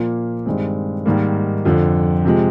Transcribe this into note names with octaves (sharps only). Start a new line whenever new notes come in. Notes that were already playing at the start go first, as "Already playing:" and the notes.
Already playing: A#2 F3 A#3
G2 D#3 G#3 C4
G#2 D#3 G3 A#3
F2 D3 F3
C3 F3 G#3